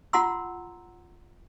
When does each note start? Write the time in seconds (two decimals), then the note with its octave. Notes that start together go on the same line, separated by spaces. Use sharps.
0.13 F4 F#5 A#5 C6 E6